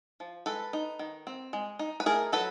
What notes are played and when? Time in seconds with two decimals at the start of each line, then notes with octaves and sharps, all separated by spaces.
0.20 F3
0.46 G#3 A4 B4
0.73 D#4
0.99 D#3
1.27 C4
1.53 G#3
1.79 D#4
2.00 B4
2.06 A3 G#4 A#4
2.32 F#3 A4 B4